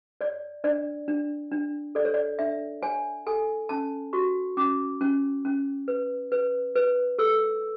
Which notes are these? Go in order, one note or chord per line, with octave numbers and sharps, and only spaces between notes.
C#5 D5
D4 D5
D4
D4
A4 D5
C#5
D5
D4 E5
C#5 G#5
A4 G#5
C#4 A5
F#4 C#6
C#4 D6
C#4
C#4
B4
B4
B4
A4 E6